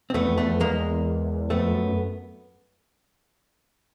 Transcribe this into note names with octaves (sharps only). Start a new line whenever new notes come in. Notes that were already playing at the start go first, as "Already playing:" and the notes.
C4
E2 A3 B3
F2
E2 A3 B3
F2
E2 G#3 A#3
F2 A3 B3
F#2